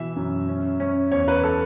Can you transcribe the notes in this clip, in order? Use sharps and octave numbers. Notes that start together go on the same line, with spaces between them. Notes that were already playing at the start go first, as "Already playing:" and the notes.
Already playing: B2 E3 E5
F#2
C#4
C#4
E2 C#5
B4
A4